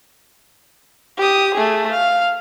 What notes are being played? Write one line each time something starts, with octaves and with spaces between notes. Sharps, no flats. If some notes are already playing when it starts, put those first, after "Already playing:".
G4 D#6
A3 G#4
F5